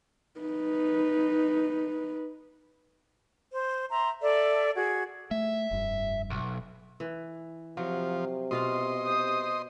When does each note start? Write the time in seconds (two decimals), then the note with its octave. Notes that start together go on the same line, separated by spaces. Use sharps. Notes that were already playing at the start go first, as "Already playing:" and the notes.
0.40 D#4 B4
3.52 C5
3.91 E5 A#5 C6
4.21 A4 D5 E5
4.76 F#4 G#4 G#6
5.31 A3 E5
5.71 F1 G2
6.30 B1
7.00 E3
7.77 C3 F3 F#3
8.51 B2 F4 D#5 F5 C6
9.06 C5 D#6